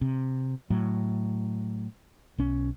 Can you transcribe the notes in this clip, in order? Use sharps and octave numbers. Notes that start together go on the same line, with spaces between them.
C3
A2 F#3
B1 C#4